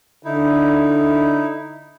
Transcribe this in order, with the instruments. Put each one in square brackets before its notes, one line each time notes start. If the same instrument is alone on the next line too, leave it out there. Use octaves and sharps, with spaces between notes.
[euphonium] D3 [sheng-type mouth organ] D#4 E4